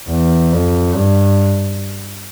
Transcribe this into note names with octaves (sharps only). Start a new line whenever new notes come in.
E2
F2
G2